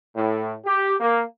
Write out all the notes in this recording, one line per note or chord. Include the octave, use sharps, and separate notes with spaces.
A2
G4
A#3